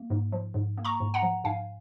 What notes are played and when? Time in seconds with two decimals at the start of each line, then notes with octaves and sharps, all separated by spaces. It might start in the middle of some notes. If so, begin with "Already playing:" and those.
Already playing: A#3
0.10 G#2
0.32 F3
0.54 G#2
0.78 A#3
0.85 A#5 C#6
1.00 G#2
1.14 F#5 A#5
1.22 F3
1.44 G#2 F5 G#5